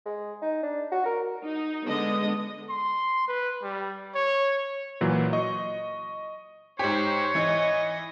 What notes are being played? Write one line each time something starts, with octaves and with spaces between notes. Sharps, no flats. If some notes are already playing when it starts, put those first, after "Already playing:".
G#3
D#4
D4
F#4
A#4
D#4
D3 G#3 B3 D#5
C6
B4
G3
C#5
A#2 E3 F#3
D#5 C#6
G#2 G4 C5 C#5
E3 D#5